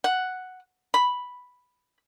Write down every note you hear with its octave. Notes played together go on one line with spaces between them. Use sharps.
F#5
B5